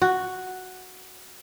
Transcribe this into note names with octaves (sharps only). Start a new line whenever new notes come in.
F#4